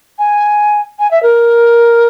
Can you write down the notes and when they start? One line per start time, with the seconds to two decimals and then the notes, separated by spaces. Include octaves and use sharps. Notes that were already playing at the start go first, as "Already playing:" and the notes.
0.19 G#5
0.99 G#5
1.11 E5
1.23 A#4